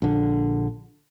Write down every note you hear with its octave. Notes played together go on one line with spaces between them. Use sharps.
A#1 D3